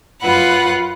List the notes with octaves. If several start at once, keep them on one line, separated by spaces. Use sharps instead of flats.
F#2 F4 B4 F#5 B5